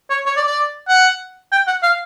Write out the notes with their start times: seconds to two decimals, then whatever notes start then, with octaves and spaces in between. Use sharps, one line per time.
0.10 C#5
0.26 C#5
0.36 D5
0.47 D5
0.88 F#5
1.52 G5
1.67 F#5
1.83 F5